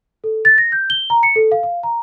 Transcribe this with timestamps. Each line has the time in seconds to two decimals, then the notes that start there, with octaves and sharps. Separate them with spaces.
0.24 A4
0.45 A6
0.58 A#6
0.72 G6
0.90 G7
1.10 A#5
1.23 C#7
1.36 A4
1.52 F5
1.63 F5
1.83 A#5